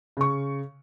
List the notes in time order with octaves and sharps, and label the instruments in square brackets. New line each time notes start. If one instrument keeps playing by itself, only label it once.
[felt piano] C#3 C#6